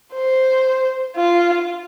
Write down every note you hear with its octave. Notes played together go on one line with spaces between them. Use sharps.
C5
F4